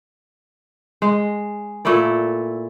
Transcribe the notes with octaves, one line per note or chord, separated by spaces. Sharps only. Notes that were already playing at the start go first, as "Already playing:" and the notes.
G#3
A#2 A3 E4 D5